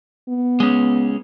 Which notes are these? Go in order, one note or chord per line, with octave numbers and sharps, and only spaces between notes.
B3
G#3 C#4